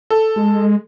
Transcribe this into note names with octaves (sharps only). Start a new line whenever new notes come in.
A4
G#3